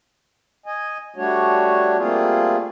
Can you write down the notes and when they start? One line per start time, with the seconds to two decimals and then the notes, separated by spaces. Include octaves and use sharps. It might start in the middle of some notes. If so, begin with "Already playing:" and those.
0.66 D#5 G#5
1.16 G3 A3 D4 F#4 C#5
1.97 G3 A3 A#3 C4 F4 G#4